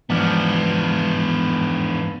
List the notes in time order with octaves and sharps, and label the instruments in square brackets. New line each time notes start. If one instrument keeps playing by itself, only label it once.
[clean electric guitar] E2 G#2 F3 [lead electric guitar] B3 D4